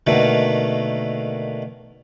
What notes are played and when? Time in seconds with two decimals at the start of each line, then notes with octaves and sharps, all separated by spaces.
0.07 B2 D3 D#3 A3 A#3